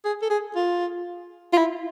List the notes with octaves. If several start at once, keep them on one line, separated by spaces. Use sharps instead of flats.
G#4
A4
G#4
F4
F4
E4